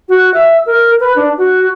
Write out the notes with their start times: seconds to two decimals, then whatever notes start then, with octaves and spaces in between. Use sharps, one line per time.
0.09 F#4
0.34 E5
0.66 A#4
1.00 B4
1.16 D4
1.38 F#4